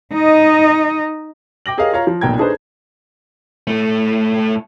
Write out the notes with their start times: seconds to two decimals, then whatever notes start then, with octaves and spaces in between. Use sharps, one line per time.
0.13 D#4 D#5
1.66 G5 D6 A#6 F#7
1.78 G4 G#4 A#4 C#5 D#5 F5
1.93 F4 C#5 F5 A#5
2.07 F3
2.21 F1 B1 A#2 G5 A#5 G#6
2.38 D4 D#4 G#4 A4 B4 C5
3.67 A2 A3